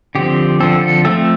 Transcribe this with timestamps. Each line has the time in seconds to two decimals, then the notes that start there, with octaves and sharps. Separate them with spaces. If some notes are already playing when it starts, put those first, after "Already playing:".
0.15 D3 F3 C4 G4
0.60 D3 F3 C4 A4
0.81 A4
1.05 F3 A3 C4 A4